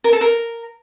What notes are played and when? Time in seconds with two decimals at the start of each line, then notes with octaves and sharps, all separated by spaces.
0.04 A#4
0.13 A4
0.21 A#4